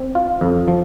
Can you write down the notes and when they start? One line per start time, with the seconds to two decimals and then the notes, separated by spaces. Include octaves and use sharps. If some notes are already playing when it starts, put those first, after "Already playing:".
Already playing: C4
0.15 F4
0.41 F2
0.68 F3